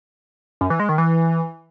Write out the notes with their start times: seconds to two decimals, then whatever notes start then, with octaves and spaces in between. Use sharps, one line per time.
0.61 F#2
0.70 E3
0.80 G#3
0.89 D#3
0.98 E3